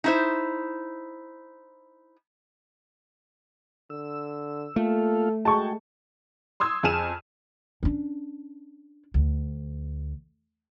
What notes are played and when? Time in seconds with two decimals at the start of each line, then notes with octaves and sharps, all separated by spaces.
0.04 D#4 E4 C5
3.90 D3 E6
4.76 A3 A#3 F4 A4 F5
5.45 G#3 F#4 G#4 G5 A5 C#6
6.60 C6 D#6 E6 G#6
6.83 F2 G#4 G#5 F6 D#7 E7
7.83 C#4 D4
9.14 D2